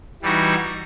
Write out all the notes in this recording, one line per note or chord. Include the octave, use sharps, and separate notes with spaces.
E3 G3 D#4 F#4